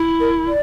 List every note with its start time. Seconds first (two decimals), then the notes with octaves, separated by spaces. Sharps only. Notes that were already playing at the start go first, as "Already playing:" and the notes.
Already playing: E4
0.20 A#4
0.47 D5